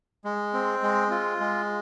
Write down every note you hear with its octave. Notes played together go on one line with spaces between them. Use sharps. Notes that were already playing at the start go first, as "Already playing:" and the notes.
G#3
C4
G#3
F4
G#3